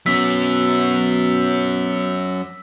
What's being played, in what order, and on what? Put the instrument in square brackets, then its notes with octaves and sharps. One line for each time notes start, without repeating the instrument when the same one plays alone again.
[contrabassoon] B2 [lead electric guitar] F#3 C#4 [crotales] E6 B6